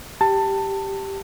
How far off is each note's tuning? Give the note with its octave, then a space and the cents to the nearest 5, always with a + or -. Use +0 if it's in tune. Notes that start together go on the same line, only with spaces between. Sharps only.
G4 +0 A5 +20